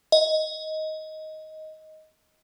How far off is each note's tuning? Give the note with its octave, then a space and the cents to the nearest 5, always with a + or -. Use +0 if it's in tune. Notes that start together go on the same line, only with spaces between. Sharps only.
D#5 +10